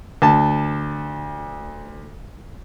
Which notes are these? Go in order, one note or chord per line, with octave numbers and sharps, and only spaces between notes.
D2 A5